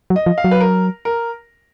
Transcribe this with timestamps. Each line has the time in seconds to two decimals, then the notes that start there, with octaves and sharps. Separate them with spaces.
0.10 F#3
0.16 D#5
0.26 F3
0.38 F5
0.44 F#3
0.51 B4
0.61 A#4
1.05 A#4